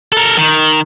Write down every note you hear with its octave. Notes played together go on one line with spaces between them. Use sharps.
A4 A#4
D#3